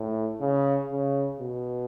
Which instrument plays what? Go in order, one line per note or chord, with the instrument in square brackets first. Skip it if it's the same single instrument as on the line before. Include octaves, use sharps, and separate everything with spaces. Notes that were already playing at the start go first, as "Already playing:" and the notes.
Already playing: [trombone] A2
C#3
C#3
B2